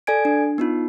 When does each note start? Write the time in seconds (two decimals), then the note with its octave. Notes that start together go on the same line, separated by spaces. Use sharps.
0.07 A4 D5 G#5 G#6 D7
0.25 D4
0.58 B3 D#4 F4